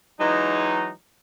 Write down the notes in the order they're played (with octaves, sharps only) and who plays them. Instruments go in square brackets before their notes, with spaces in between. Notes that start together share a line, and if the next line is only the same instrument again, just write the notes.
[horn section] E3 F#3 G#3 D#4